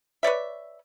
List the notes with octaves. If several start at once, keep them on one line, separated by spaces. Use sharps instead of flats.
B4 C#5 D5 E5